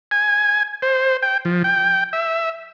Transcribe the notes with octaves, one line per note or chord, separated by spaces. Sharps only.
G#5
C5
G5
F3
G5
E5